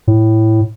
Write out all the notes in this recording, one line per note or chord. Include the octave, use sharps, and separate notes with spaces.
A2